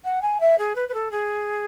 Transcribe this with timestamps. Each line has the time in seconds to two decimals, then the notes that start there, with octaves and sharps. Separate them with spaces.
0.04 F#5
0.22 G#5
0.40 E5
0.58 G#4
0.75 B4
0.89 B4
0.94 A4
1.11 G#4